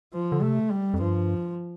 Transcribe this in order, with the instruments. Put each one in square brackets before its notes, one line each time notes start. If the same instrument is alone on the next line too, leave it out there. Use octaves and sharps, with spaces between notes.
[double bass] F3
[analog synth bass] D3
[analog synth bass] C3 [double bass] A3
[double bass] G3
[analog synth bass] F2
[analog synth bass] G2 [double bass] F3